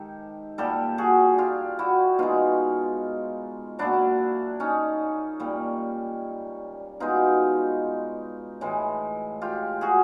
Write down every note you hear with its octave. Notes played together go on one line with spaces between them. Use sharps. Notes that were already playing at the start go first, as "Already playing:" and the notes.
Already playing: G#2 D#3 G4 A4
A#2 G3 G4 A4
F#4 G#4
F4 G4
E4 F#4
B2 G#3 D#4 F4
A#2 F#3 D4 E4
C#4 D#4
A#2 G3
B2 G#3 D#4 F4
A2 E3 G#3
F4 G4
F#4 G#4